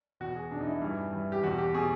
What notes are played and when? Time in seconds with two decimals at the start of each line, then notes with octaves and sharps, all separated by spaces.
0.20 E2 B2 F#4
0.36 G#4
0.51 E2 B2 D4
0.61 D#4
0.66 E4
0.82 G2 E3
1.12 G2 E3
1.32 G4
1.43 E2 B2 F#4
1.58 G4
1.74 B2 G#4